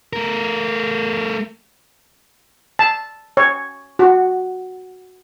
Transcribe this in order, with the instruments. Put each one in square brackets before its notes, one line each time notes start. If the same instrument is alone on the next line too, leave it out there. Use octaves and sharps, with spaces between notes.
[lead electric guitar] A3 A#4
[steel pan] A5
C#5
F#4